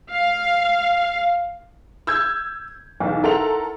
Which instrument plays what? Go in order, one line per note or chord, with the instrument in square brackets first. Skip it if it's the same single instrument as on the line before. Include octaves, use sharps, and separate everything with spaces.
[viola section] F5
[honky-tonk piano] E6 G6 G#6
B1 E2
E4 A4 A#4 F#5 C6 F7